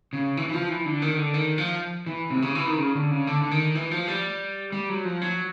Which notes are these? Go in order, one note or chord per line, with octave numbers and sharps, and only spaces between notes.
C#3
E3
E3
F3
E3
D3
D#3
D3
D#3
F3
E3
C3
C#3
E3
D#3
C#3
D3
C#3
D3
D3
D#3
E3
F3
G3
G3
F#3
F3
F#3